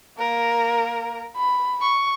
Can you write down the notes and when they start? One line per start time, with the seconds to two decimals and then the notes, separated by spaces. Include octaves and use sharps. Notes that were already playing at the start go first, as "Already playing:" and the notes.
0.19 A#3 A#4
1.37 B5
1.82 C#6